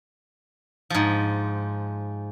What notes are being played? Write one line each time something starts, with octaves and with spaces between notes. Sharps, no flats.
G#2 F3